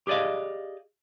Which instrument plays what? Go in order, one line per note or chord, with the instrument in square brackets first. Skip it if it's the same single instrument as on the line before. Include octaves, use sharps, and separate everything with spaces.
[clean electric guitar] G4 G#4 D5 D#5 F5